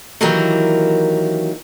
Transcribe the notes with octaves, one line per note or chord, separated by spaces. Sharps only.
D#3 E3 F#3 A#3 G4 A#4